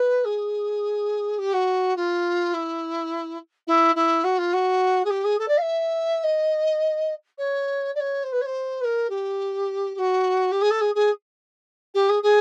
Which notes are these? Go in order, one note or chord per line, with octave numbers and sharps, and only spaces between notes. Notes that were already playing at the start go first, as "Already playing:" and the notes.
Already playing: B4
G#4
G4
F#4
F4
E4
E4
E4
F#4
F4
F#4
G#4
G4
G#4
A4
D5
F5
E5
D#5
C#5
D5
C#5
C5
B4
C#5
C5
B4
A#4
G4
G4
F#4
G4
G#4
A4
G#4
G#4
G4
G#4
G#4